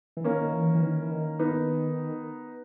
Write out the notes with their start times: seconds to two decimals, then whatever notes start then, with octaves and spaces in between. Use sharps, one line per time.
0.17 E3
0.24 D#3 A#3 C#4
0.41 D#3
0.53 E3
0.75 E3
0.82 D#3
1.02 E3
1.11 D#3
1.39 B3 D#4